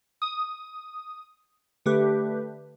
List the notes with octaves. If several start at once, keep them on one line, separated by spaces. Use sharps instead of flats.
D#6
D3 A3 G4 B4